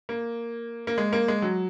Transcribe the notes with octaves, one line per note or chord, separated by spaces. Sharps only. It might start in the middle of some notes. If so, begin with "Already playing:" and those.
A#3
A#3
G#3
A#3
G#3
F#3